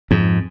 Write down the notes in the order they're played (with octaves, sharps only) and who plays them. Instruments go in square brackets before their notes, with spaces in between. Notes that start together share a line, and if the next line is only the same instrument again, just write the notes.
[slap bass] F2 G#2